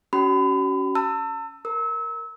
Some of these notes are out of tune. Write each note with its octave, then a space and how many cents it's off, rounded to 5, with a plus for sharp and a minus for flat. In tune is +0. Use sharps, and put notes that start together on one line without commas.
C#4 +10 F#4 +30 B5 +35
A5 +40 E6 +10
A#4 +0 E6 -30